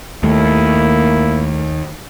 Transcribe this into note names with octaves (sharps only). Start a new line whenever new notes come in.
D#2 A3 A#3 E4